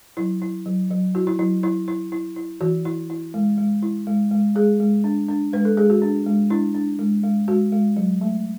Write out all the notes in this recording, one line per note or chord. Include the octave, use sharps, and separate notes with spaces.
F#3 E4
E4
F#3
F#3
E4 F#4
E4
F#3 E4
E4
E4
E4
E4
E3 F#4
E4
E4
G#3
G#3
E4
G#3
G#3
G#3 G#4
G#3
D4
D4
G#3 B4
A4
G#3 G#4
F#4
D4
G#3
D4 E4
D4
G#3
G#3
G#3 F#4
G#3
F#3
A3